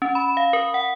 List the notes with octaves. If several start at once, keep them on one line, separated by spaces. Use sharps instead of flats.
C#4
B5
F5
A#4
F#5